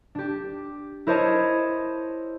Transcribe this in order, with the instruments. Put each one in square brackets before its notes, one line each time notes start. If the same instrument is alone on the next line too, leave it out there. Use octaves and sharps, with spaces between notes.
[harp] D4 G4
E4 A#4 C5 C#5 D#5 A5